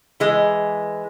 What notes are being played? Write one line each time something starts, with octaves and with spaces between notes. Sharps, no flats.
E3 G#3